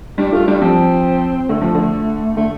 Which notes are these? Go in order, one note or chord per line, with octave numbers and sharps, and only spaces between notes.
G3 D4
A3 F4
G3 D4
F3 C4
D3 A3
F3
D3
D3 A3